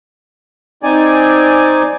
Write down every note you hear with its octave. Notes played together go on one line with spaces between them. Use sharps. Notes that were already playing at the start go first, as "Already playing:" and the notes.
C4 D#4 D5 G#5